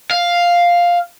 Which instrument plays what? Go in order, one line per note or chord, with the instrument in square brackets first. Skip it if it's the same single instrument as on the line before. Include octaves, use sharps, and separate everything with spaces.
[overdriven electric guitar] F5